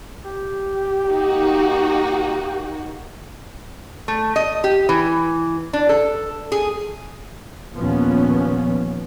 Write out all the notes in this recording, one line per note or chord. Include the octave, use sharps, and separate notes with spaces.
G4
A#3 D#4 F#4
A3
D#5
G4
E3
D4
A4
G#4
D#2 A#2 F3 B3 C#4